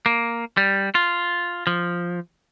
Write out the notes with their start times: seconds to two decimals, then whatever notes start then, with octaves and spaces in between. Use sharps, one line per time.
0.06 A#3
0.57 G3
0.95 F4
1.67 F3